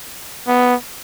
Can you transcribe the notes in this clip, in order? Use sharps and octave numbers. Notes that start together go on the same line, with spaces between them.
B3